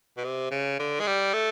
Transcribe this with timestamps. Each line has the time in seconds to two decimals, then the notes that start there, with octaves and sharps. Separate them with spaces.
0.17 B2
0.24 C3
0.51 C#3
0.79 D3
1.00 G#3
1.07 G3
1.33 A3